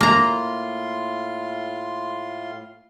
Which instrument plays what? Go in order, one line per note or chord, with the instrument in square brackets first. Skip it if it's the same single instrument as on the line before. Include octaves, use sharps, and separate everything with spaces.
[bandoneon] A2 F4 C6 [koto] A#3 A#5